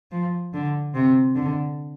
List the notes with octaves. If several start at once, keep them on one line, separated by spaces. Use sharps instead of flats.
F3
D3
C3
D3